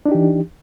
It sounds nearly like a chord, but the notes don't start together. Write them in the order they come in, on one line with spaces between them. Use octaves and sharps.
D4 D#4 G4 E3